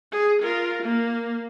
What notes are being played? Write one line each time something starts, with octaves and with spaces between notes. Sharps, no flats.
G#4
F4 A#4
A#3